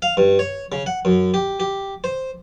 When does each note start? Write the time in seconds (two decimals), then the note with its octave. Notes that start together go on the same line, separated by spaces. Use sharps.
0.02 F5
0.17 G2
0.39 C#5
0.72 C#3
0.86 F#5
1.05 F#2
1.34 G4
1.60 G4
2.04 C5